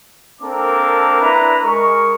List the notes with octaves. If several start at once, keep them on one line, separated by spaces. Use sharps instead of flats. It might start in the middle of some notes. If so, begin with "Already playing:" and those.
A#3 C4 D4 A4 A#4 D6
D4 E4 B4 A#5
G#3 A#4 C#6